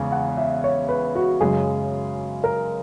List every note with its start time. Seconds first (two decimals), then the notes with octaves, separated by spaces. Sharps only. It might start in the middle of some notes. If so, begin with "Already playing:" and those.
Already playing: E2 C#3 G#3 C#4 G#5
0.12 F#5
0.37 E5
0.64 C#5
0.89 B4
1.15 F#4
1.41 F#2 C#3 G#3 G#4
2.44 A#4